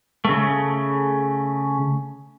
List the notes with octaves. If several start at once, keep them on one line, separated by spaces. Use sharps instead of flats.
C#3 A3